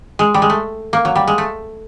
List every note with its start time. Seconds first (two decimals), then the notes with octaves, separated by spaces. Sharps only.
0.19 G#3
0.34 G3
0.42 G#3
0.50 A3
0.93 A#3
1.05 F#3
1.16 G3
1.27 G#3
1.38 A3